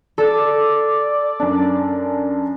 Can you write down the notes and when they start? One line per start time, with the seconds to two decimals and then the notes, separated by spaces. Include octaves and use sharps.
0.18 A4 D5
1.40 F#2 D4